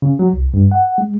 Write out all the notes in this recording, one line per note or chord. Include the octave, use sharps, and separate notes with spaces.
C#3
F#3
C2
G2
F#5
G#3